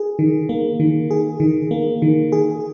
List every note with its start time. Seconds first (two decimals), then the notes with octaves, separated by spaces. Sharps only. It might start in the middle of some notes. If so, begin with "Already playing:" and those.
Already playing: G#4
0.19 D#3
0.49 A#3
0.80 D#3
1.11 G#4
1.40 D#3
1.71 A#3
2.02 D#3
2.32 G#4